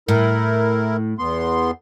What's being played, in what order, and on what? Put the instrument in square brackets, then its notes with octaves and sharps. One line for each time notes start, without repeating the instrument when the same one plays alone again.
[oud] A2 [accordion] E4 A#4
[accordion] E2 B3 C6